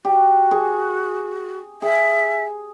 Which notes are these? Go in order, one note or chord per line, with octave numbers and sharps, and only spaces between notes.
F#4 G4
G#4 C#6
G#4 E5